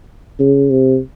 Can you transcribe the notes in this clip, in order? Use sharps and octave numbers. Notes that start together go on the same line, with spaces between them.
C#3
C3